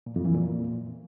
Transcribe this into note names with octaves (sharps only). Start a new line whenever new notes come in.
A#2
F2
E3
A#2